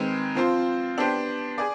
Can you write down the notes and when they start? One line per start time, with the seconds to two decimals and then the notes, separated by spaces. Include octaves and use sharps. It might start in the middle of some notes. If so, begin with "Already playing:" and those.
Already playing: D#3 G#3 C4 D#4 B4
0.35 F3 C4 F4 C5
0.98 B3 D4 G4 C5
1.58 G#4 D5